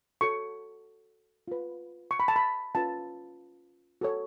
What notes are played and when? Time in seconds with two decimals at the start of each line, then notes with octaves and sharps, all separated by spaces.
0.21 F#4 A4 C#5 C#6
1.48 F4 B4
2.11 C#6
2.20 B5
2.28 A5
2.36 B5
2.75 C#4 F4 B4 A5
4.01 F#4 A4 C#5